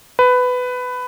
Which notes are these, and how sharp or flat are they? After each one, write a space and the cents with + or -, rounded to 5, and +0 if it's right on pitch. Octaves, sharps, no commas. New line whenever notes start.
B4 +15